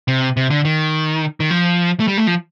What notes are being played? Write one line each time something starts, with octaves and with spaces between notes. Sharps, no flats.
C3
C3
D3
D#3
D#3
F3
A3
G3
A3
F3